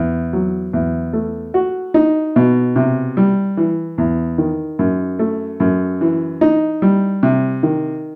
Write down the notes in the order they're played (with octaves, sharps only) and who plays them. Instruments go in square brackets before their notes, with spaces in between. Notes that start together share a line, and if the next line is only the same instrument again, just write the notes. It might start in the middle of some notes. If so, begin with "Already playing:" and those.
Already playing: [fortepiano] E2
F#3
E2
A3
F#4
D#4
B2
C3
G3
E3
E2
D#3
F#2
A3
F#2
E3
D#4
G3
C3
D#3